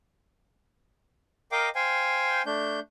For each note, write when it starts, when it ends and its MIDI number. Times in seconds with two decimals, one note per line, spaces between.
1.52 1.69 70
1.52 1.69 75
1.52 1.69 77
1.52 1.69 79
1.52 1.69 86
1.75 2.42 72
1.75 2.42 77
1.75 2.42 79
1.75 2.42 80
2.46 2.80 57
2.46 2.80 62
2.46 2.80 91